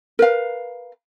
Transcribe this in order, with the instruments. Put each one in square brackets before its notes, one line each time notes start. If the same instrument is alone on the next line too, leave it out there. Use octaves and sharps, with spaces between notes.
[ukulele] A#4 B4 F5